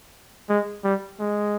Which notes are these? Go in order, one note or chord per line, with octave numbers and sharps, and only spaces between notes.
G#3
G3
G#3